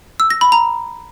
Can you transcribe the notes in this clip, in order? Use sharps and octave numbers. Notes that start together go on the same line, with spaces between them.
E6
A#6
B5
A#5